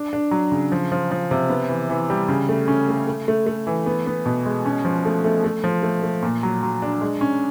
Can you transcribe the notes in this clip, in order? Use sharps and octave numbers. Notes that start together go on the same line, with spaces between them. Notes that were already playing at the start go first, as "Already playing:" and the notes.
Already playing: D4
D4
F#3
C#3
F3
F3
F3
C3
B3
E3
E3
G3
C#3
A3
C#4
A3
A3
A3
A3
E3
B3
B3
B2
G#3
C#4
F3
A3
A3
A3
F3
A3
A3
A#2
F#3
F#3
D4
G#3
C#4